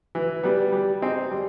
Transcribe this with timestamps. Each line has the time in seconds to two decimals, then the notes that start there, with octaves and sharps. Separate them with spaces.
0.15 E3
0.43 G3 B3
0.72 G3
1.02 C4 D#4 G#4
1.31 G3